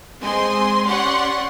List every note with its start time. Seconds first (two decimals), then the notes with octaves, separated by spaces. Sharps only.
0.21 G#3 C4 D#5 G#5 C6
0.87 C#4 G4 D5 F#5 C6 C#6